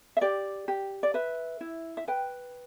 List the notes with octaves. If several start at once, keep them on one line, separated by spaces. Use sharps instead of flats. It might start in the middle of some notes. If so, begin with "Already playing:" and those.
E5
G4 D5
G4
D5
B4 E5
E4
E5
B4 G5